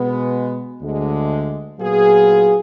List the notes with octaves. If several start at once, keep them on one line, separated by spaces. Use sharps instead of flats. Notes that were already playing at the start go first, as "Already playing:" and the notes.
Already playing: B2 G#3 B3
D2 D3 G#3
A#2 F#3 B3 F4 G#4